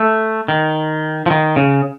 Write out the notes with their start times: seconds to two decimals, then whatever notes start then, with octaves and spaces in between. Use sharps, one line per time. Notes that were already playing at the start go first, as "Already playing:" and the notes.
Already playing: A3
0.48 D#3
1.26 F3
1.30 D#3
1.56 C#3